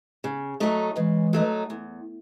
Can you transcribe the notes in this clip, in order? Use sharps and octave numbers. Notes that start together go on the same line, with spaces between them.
C#3
F#3 A3 D#4
C#3 E3 G#3
F#3 A3 D#4
E2